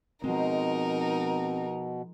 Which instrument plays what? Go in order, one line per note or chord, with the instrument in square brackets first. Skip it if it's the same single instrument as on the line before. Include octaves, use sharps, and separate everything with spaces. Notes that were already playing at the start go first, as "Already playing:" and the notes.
[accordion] B2 [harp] F3 G#3 [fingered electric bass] C4 [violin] D#4 A#4